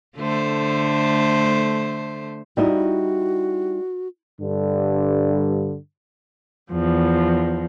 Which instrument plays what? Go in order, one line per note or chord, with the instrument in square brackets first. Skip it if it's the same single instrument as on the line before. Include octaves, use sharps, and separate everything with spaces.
[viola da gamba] D3 A3 C5
[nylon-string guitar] G3 D#4 E4 [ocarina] F#4
[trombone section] G2 D3
[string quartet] E2 F3